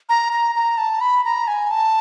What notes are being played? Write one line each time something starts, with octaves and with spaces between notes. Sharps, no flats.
A#5
A#5
A#5
A5
B5
A#5
G#5
A5